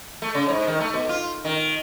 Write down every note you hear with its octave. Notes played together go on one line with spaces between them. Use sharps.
A3
C#3
G#2
D#3
A3
B2
F4
D#3